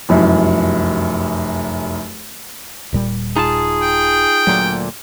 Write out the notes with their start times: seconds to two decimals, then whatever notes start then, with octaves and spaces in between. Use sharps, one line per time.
0.09 F1 C2 F#2
2.93 D#1 A#2 G3
3.36 D#4 F4 G#4 A5
3.81 G5
4.47 D2 A#2 D3 F#3